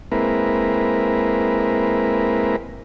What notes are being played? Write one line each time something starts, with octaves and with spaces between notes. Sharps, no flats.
G#3 A#3 C4 E4 A#4 B4